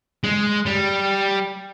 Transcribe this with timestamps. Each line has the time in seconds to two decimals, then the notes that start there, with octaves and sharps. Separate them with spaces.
0.24 G#3
0.66 G3